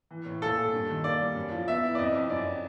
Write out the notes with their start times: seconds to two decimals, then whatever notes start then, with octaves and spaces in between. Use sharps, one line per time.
0.11 E3
0.25 A2
0.42 A#2 A4
0.57 A#2
0.73 G2
0.89 D#3
1.04 A#3 D5
1.20 G3
1.36 F#2
1.51 F3
1.68 B3 E5
1.83 E4
1.95 D5
1.98 F2 D#5
2.15 F2
2.30 F#2 D5